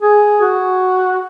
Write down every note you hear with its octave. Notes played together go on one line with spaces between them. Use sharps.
G#4
F#4